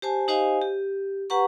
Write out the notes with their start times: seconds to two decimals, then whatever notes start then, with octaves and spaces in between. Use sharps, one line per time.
0.02 G4 C5 G#5 A5
0.28 D#4 G4 C5 D#5 F5 G#5
0.62 G4
1.30 G4 B4 F#5 A#5 C#6